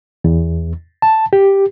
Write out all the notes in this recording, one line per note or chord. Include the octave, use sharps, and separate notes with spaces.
E2
A5
G4